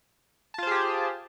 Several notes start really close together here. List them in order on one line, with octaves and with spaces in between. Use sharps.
A5 F4 C5 G#4 G4